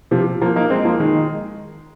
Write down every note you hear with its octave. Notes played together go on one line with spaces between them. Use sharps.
C3 F3
F3 A#3
A#3 D#4
G#3 C4
F3 A#3
D#3 G#3